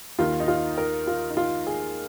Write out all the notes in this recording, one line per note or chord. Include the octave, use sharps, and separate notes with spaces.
D#2 D#3 F4
D#4
F4
A#4
F4
D#4
F4
G#4